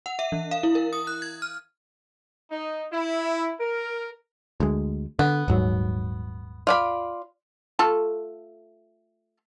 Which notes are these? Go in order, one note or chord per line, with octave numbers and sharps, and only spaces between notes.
F#5
E5
E3
F5
E4
A#4
D#6
F#6
G#6
F6
D#4
E4
A#4
D2 G#3
D3 B3
D#1 G#2 F#3
F4 D5 B5
A3 F4 A4